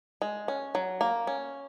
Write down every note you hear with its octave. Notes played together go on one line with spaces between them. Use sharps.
G#3
C#4
F#3
A#3
C#4